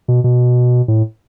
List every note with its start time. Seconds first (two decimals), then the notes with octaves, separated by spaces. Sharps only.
0.08 B2
0.24 B2
0.88 A2